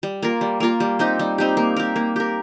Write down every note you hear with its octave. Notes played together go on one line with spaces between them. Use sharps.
G3
A#3 F4 A#4
G3
A#3 F4 A#4
G3
C4 D#4 G4
G3
C4 D#4 G4
A#3
G4 A#4
A#3
G4 A#4